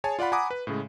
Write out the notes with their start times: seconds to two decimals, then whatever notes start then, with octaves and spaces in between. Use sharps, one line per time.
0.04 G#4 C#5 G#5 A5
0.19 F4 D5 F5 F#5 B5
0.32 F#5 G#5 A#5 B5 D6 D#6
0.50 B4
0.67 A2 C#3 G#3